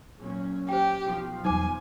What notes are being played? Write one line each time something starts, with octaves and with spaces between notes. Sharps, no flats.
A#2 F#3 C#4
G4 C5 G5
B1 B2 F3
E2 F#3 G3 D#4 C5 G#5 D6